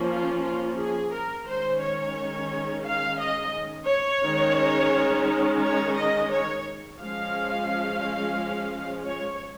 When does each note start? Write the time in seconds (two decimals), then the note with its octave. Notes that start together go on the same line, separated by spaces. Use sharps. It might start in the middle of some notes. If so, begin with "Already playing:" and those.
Already playing: F3 A#3 C#4
0.09 F4
0.44 F4
0.78 G#4
1.13 A#4
1.47 D#3 G#3 C#4 C5
1.82 C#5
2.86 F5
3.20 D#5
3.89 C#5
4.24 D#3 G#3 C#4
5.62 C#5
5.97 D#5
6.30 C#5
7.00 F3 G#3 C#4 F5
9.07 C#5